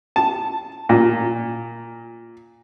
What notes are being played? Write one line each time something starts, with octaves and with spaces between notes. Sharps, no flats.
A5
A#2